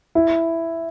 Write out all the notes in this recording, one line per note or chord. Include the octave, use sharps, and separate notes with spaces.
E4